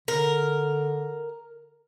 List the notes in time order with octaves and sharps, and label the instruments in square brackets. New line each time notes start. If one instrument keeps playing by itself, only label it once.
[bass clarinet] D3 [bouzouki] A#4